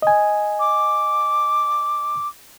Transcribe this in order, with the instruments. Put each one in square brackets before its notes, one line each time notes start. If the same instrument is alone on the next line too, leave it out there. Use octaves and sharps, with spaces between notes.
[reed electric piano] D#5 G#5
[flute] D6